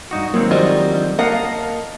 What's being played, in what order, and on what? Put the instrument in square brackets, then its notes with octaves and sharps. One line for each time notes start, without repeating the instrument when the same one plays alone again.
[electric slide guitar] G2 D#4 F#4
[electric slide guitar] D#3 G#3 C4 [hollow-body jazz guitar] F#3 [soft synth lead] A#3
[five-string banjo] F3 G3 F#4 [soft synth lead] D#5
[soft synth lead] D3
[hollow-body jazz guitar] A#3 A#4 [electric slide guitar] D#5 F5 [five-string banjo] F#5 [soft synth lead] A5